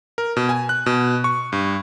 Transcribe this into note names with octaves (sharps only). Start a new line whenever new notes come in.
A#4
B2
G#5
F#6
B2
C#6
G2